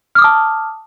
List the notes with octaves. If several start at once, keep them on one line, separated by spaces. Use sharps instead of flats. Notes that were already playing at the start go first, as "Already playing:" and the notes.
A5 D6 D#6 F6